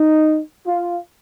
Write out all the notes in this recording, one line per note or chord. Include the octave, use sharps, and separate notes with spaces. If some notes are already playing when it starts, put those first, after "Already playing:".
Already playing: D#4
F4